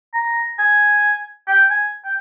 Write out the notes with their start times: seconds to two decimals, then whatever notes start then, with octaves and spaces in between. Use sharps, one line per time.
0.14 A#5
0.59 G#5
1.47 G5
1.70 G#5
2.05 G5